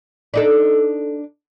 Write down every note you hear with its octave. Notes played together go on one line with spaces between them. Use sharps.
D4 D#4 A4